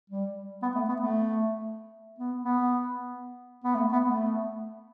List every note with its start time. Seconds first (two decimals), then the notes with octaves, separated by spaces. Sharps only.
0.10 G3
0.62 B3
0.75 A3
0.89 B3
1.01 A3
2.18 B3
2.45 B3
3.64 B3
3.75 A3
3.92 B3
4.09 A3